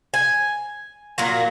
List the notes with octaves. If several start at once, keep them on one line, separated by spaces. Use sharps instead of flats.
G#5
A#2 F#3 F#4